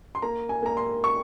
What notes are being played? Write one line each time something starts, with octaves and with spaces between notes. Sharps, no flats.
C6
A#3 A#5
G#5
A#3 A#5
C6
C#6